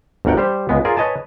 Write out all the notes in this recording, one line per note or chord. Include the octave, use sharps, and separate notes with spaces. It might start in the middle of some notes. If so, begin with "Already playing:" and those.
G1 D2 A#4 F#5 G5
G3 G4 C5
C#2 G#3 B3
F4 G#4 A#4 D5
B4 C#5 D#5 G#5 A5